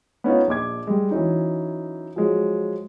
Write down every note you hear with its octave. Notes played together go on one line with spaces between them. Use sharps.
B3 C#4 D#4 F4
A#1 D#5 D6 G#6
G3 G#3
E3 F#3 C#4 D#4
F3 F#3 G#3